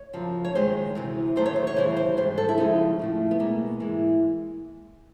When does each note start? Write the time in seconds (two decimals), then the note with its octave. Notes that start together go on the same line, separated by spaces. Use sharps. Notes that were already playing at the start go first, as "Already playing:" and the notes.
Already playing: C#5
0.13 F#2 C#3 F3
0.45 C#5
0.55 G2 D#3 G#3 C5
0.95 D2 C3 E3
1.36 F#2 D#3 F#3 A3 C5
1.46 C#5
1.56 C5
1.67 C#5
1.76 D#2 C#3 E3 G3 C5
1.97 C5
2.17 G#2 D#3 G3 C5
2.38 A4
2.49 E4
2.58 D#2 C#3 F3 G#3 D#4
2.99 A2 F3 A3
3.31 B3
3.39 B2 G#3 A#3
3.80 G#2 E3 G#3